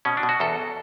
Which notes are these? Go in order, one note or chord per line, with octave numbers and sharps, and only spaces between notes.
B2 C#4
D4
B2
F#4
E2 A4